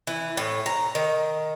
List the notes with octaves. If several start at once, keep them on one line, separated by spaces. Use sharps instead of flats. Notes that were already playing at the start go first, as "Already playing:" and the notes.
E3
A2
A#5
D#3